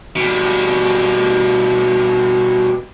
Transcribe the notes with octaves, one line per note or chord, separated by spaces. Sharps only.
B2 G3